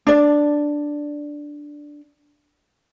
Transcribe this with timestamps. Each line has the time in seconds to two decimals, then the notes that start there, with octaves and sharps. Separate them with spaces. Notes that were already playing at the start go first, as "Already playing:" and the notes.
0.07 D4 D5